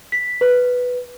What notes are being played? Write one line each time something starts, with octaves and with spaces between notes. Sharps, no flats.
B6
B4